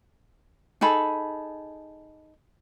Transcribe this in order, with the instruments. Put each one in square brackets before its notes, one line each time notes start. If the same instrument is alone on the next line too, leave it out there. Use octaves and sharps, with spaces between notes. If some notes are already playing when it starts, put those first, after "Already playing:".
[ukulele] D#4 G#4 A4 B5